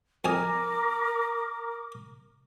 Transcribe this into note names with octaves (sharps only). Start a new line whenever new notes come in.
F2 A#4 G#5 D6 D#6